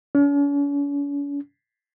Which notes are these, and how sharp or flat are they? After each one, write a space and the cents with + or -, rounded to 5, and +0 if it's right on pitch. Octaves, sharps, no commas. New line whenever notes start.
C#4 +45